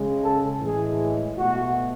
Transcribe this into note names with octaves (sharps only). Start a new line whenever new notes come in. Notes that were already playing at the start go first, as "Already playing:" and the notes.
Already playing: C#3 G#3
A4
A2 E3 G#3 G#4
B2 A3 F#4